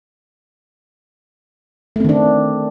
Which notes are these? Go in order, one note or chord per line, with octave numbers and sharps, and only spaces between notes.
D#3 A3 C4 D4